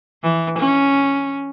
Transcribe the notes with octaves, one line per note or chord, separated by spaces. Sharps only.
E3
C#4